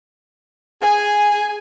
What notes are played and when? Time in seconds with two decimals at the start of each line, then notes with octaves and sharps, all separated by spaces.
0.82 G#4 G#5